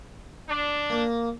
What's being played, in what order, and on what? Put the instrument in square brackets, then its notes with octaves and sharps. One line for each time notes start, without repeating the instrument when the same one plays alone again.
[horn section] D4
[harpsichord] A#3